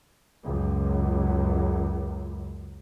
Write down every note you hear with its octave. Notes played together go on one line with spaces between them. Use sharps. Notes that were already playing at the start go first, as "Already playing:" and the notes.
C#2 F#2